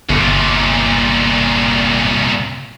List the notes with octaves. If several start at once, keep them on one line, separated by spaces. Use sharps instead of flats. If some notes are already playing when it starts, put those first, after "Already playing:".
G1 C2 A#2